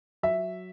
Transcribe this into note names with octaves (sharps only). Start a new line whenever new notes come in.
F#3 E5